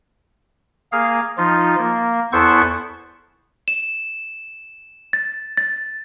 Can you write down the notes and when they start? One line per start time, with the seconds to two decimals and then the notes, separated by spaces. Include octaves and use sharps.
0.92 A#3 G#4 F5
1.38 F3 D#4 F4
1.78 A#3
2.33 E2 B3 E4 A4 C5 C#6
3.68 E7
5.13 A6
5.57 A6